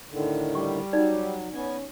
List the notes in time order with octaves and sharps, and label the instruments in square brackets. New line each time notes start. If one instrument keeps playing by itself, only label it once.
[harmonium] A2 D3 D#3
[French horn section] G3 [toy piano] C#6
[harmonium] F#3 [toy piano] D#4 D5
[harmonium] B3 G#5 [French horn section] C#4